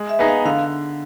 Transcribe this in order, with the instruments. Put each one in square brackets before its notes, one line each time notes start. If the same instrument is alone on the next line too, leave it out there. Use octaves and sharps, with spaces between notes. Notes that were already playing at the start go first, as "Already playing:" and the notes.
Already playing: [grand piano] G#3
[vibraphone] E5
[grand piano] B3 D#4 G#4
[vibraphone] F5
[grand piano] D3 [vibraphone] F5